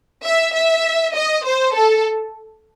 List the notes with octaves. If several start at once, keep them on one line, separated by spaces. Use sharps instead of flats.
E5
E5
D#5
C5
A4